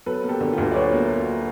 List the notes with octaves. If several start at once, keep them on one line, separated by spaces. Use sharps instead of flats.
F#3 A4 B4
A#3
G4 A4
D3
F4 G4
D2
D5
F#3 B4 C#5
A#3
A#3